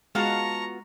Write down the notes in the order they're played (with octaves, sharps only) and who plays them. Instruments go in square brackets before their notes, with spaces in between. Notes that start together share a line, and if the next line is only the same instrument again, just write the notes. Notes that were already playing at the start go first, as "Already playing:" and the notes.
[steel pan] G#3 [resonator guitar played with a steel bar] B3 F4 F#4 [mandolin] F5 A5 [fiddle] A#5 C#6